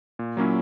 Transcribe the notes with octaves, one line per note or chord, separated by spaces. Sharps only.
A#2
F#3 A#3 C#4 E4